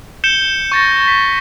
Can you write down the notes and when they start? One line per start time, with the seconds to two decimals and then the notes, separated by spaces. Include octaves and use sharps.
0.24 G6 C#7 E7 G7
0.72 C#6 A6 A#6
1.08 B6